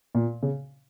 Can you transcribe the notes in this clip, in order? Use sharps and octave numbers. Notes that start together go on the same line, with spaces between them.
A#2
C#3